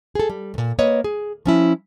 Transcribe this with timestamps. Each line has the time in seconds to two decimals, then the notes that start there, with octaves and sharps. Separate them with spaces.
0.15 G#4 A4
0.29 G3
0.54 D2 A#2
0.79 A#3 B4 C#5 D#5
1.04 G#4
1.46 F3 C#4 E4